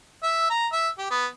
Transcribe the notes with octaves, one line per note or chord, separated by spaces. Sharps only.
E5
A#5
E5
G4
B3